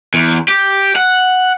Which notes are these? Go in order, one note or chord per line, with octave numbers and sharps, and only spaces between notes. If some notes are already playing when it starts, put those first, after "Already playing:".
E2
G4
F#5